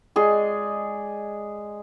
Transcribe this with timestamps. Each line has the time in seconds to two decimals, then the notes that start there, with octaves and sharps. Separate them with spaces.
0.16 G#3 G#4 D5 D#5